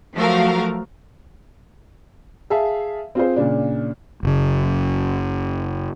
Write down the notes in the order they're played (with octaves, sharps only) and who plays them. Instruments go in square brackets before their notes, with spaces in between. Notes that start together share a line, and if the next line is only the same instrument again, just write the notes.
[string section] F3 F#3 A3 F#4 A#4 F5
[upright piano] G#4 E5 F5 A5
C4 F4 G#4 C5
A#2 C#3 D4
[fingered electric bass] F#1 C#3